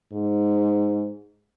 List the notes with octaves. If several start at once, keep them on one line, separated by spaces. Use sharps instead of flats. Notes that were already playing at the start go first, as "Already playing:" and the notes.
G#2